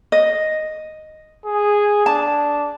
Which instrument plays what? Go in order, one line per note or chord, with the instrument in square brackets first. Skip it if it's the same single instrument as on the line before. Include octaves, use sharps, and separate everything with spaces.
[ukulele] D#5
[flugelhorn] G#4
[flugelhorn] D4 [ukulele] A5